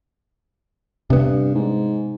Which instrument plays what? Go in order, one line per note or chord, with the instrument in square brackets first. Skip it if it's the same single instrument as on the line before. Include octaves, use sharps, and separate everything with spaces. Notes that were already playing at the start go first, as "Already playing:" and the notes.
[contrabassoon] G2 [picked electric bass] C3 B3
[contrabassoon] G#2